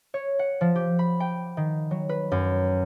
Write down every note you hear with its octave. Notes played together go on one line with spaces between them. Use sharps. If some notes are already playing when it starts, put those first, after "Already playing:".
C#5
F#5
F3
G4
B5
G5
D#3
F#3
B4
F#2